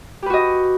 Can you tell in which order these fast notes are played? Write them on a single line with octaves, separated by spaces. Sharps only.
G4 B4 F#4 D#5